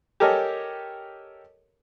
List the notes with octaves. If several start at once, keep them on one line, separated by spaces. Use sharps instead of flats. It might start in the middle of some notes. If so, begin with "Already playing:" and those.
G4 A4 A#4 C#5 D#5 G#5